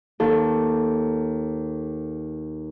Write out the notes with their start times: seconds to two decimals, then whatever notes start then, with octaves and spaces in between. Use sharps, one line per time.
0.20 D#2 A4